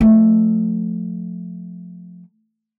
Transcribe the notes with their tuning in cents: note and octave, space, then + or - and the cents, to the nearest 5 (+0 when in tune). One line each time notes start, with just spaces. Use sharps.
F3 +30 A3 +0